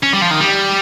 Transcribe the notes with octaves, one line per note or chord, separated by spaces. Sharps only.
C#4
G3
F3
D#3
G3